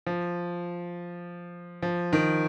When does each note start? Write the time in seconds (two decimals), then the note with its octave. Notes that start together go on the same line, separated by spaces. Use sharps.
0.06 F3
1.82 F3
2.13 D#3